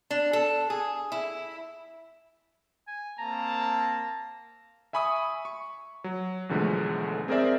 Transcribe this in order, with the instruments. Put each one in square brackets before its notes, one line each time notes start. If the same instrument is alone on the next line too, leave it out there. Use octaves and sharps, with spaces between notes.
[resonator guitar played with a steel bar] D4
A4
G#4
E4
[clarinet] G#5
[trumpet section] A#3 C4 A5 [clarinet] A#5
[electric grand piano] E5 G#5 B5 C#6 D#6
C#6
F#3
B1 E2 D3 F3 G#3 A3
C4 G#4 A#4 C5 D5 E5